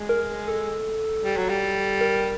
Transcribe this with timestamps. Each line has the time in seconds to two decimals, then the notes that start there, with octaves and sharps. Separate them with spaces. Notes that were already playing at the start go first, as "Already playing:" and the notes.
Already playing: G#3
0.09 A#4
0.48 A4
1.24 G3
1.37 F#3
1.49 G3
2.01 A#4